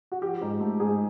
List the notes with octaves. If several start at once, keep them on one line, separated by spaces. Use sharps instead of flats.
F#4
F3 G4
G#2
A3
G#2 G#4